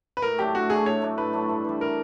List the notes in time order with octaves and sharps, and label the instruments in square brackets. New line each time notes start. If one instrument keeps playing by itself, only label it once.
[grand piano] B4
[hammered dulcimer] A2 [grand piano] A#4
[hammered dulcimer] F#3 A3 D4 [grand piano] G4
[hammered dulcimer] A2 [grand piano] F#4
[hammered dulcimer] F#3 A3 D4 [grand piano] G#4
[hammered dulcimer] A2 [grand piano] C#5
[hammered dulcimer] F#3 A3 D4
[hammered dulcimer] A2 [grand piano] B4
[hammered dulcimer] F#3 A3 D4
G2
E3 G3
[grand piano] A#4